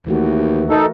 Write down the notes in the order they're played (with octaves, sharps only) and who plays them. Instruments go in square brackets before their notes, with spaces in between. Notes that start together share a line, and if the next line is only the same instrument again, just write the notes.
[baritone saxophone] D#2 [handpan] E3 A3 F#4
[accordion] D#4 A4 [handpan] A#4